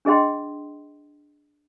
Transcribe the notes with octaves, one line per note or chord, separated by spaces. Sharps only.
D4 G#4 D#5 G5 C6